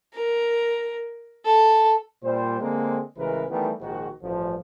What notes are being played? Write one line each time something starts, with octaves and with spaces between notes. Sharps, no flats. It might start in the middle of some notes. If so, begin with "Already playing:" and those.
A#4
A4
A#2 G3 C5
D3 G#3 A#3 C4
A1 C#3 E3 G#3 A#4 B4
D#3 E3 G3 A3 B3
A#1 G#2 D#3 F#4
A1 G2 F3